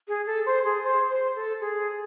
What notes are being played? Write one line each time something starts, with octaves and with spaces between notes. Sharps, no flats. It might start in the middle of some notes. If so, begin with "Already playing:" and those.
G#4
A4
C5
G#4
C5
C5
A4
G#4